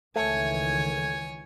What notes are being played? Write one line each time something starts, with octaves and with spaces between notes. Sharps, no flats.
C#2 D#3 E3 A3 C#5 G#5